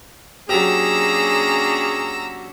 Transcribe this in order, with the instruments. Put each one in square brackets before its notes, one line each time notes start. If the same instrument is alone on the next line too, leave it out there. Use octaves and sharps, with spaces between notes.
[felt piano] F#3 G4 [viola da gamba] A#3 C#4 D4 [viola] G#4 [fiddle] A#5 E6